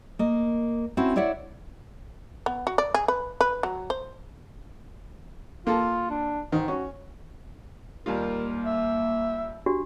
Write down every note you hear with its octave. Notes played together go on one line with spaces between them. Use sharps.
A#3 D#5
C4 C#4 E4 F#4
E4 C#5 D5 E5 F#5
B3
F#4
D5
G#4
B4
B4
F#3
C5
A#3 F4 A4
D4
G#2 D#3
C#4 F#4
D#2 G3 A#3 F4 A#4
E5
D4 F#4 G4